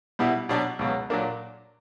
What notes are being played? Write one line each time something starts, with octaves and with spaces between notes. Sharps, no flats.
B2 G3 B3 E4
B2 F#3 B3 D4
C#2 B2 F#3
A#2 F#3 A#3 D4